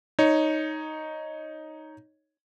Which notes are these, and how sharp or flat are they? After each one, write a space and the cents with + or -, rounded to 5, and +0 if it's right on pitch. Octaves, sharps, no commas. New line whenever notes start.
D#4 +0 C#5 +0